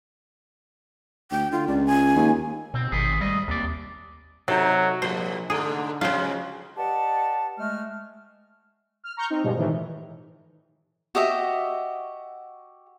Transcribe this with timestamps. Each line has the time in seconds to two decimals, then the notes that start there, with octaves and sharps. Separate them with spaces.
1.31 D2 G5
1.52 D3 F4
1.68 C#2 D5
1.86 G#5
2.16 D#2
2.74 B2 C4
2.92 G#1 C3 B3 G#4
3.21 G#2 G3 A3 D#5
3.48 D#2 C3 D5
4.48 C3 F#3 D#4 A4
5.02 A#1 F3 C5
5.50 G#2 D3 A3 G#4
6.01 C#3 F3 F#3 G#3 F4 C5
6.76 G4 B4 D5 D#5 F#5 A5
7.59 G#3 A3 F6
9.04 F6
9.17 A#5 C#6 F6 G6
9.30 C4 D#4
9.43 G2 B2 F3 G3 G#3
9.57 A2 D#3 E3
11.15 F#4 G4 D#5 E5